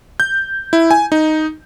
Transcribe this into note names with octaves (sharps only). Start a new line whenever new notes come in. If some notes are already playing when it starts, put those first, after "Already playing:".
G6
E4
G#5
D#4